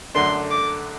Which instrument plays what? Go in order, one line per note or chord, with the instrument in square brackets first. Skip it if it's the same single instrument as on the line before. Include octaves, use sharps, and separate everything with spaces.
[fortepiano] F#2 D3 A3 D4 [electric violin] C6
[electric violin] D6